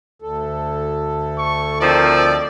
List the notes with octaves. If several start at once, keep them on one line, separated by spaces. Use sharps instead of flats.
D2 A4
C#6
D#3 F3 C4 D5